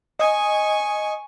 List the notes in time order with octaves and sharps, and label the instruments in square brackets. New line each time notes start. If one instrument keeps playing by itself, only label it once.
[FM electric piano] D#5 D#6 [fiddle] G#5 C#6